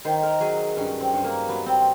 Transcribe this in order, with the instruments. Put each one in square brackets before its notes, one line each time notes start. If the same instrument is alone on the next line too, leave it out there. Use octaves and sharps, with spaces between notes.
[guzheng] D#3 C5
A#4
F#3 G#4
G2 C#4
C4
G2
A#3
F#3 B3
C4